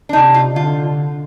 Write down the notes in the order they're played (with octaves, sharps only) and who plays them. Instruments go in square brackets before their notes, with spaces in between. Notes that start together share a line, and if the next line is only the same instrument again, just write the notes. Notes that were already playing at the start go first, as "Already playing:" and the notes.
[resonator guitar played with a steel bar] D4
[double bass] C3 [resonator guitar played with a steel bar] D#4
[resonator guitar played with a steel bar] F4
[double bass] D3 [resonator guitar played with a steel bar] F4